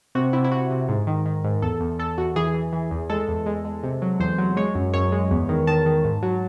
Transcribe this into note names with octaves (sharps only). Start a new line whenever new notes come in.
C3 F#4
C3 E4
E4
C3 F#4
C3
G#2
D#3
D#3
G#2
E2 A4
E2
E2 A4
E2 F#4
E3 G#4
E3
E3
E2
G#3 A4
E2
G#3
G#3
C3
F#3
E2 C5
F#3
G#3 C#5
F#2
F#2 C#5
G#3
E2
D#3
D#3 A5
D#3
G#2
F#3